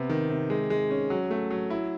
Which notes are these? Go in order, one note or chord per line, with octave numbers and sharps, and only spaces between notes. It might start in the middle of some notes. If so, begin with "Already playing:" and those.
Already playing: C3 B3
D#3
C3
G#3
G#3
C#4
F#3
A3
F#3
E4